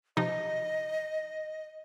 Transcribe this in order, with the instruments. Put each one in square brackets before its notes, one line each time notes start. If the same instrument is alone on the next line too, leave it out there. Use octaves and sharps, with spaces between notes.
[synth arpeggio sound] C3 F3 D#4 [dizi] D#5